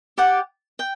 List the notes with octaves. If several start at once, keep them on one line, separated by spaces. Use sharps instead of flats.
G4 D5 F#5
G5